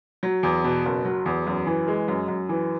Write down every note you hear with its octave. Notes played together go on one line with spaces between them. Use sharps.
F#3
E2
B2
F#1
F#3
E2
F#2
E3
G#3
F#2
F#2
E3